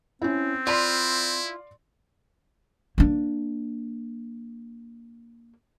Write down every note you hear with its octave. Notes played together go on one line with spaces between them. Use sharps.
C4 C#4 E4
E4 F4 D5 B5 C6
A#3 D4